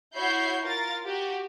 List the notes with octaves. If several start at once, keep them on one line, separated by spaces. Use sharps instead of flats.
E4 F#4 C#5 B5 G6 C7
F4 A#4 A6
F#4 G4